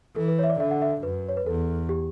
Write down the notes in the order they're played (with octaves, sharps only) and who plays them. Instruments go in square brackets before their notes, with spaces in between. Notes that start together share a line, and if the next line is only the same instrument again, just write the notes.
[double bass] E3 [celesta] A4
[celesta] B4
C#5
E5
D5
[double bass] D3 [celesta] E5
[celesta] F#5
E5
[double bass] F#2 [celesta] B4
[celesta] C#5
B4
[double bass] E2 [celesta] A4
[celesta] G4